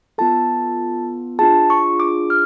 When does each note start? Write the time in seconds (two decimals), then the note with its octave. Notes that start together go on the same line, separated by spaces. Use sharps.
0.18 B3 F4 A4 A5
1.39 D4 F4 G#4 A5
1.70 C#6
2.00 D6
2.30 F6